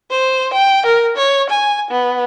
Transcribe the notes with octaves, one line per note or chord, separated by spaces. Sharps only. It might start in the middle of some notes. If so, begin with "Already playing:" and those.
C5
G5
A#4
C#5
G#5
B3